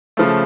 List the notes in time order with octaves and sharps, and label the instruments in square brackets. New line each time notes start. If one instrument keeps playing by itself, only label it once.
[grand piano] C#3 F3 A3